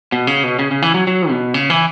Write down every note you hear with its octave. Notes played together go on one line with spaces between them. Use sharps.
B2
C#3
B2
C#3
C#3
E3
F#3
F#3
B2
C#3
E3